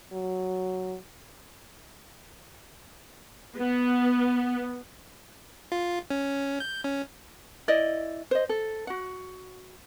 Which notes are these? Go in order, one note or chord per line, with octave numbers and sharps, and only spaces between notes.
F#3
B3
F4
C#4
G6
C#4
E4 D5 D#5
C5 D#5
A4
F#4 F#5